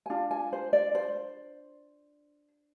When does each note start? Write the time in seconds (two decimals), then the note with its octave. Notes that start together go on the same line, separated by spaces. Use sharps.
0.06 G#5
0.10 D4 F4
0.31 G#5
0.53 C5
0.73 D5
0.95 C5